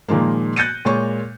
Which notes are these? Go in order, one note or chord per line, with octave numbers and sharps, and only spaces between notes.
A#2 D#3 F3 G#3 A#3
F#6 G6 A6 A#6 C#7 D#7
A#2 G#3 C#5 C#6